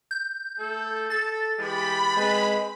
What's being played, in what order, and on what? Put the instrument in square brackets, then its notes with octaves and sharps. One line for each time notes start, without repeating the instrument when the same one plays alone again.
[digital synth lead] G6
[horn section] A3 A4
[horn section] A4 [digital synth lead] A6
[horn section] E3 G#3 G4 [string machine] B5
[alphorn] G#3 [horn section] C4 B4